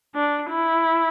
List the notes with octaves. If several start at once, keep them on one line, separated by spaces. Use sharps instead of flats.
D4
E4